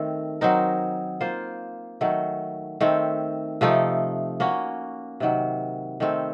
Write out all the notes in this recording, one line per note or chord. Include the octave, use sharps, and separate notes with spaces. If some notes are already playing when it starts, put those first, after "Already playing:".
Already playing: D#3 A3 C4
F#3 C4 D#4 A#4
A#3 F4 C5
D#3 F#3 A3
D#3 A3 C4
C3 F3 A3 D#4
A#3 C#4 F#4
C3 D#3 F#3
D#3 A3 C4